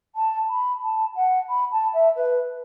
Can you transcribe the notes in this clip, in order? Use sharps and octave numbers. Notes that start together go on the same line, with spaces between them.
A5
B5
A5
F#5
B5
A5
E5
B4